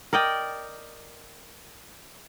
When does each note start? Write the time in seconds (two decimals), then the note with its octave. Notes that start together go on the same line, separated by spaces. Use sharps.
0.13 A#4 D5 D#5 G5